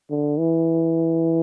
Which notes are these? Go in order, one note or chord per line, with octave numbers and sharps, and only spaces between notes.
D3
E3